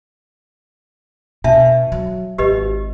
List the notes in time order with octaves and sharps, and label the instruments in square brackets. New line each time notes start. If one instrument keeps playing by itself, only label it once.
[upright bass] B2 [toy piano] D4 E5 A5
[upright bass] F#3
[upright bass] G#1 [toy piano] G4 B4 D#5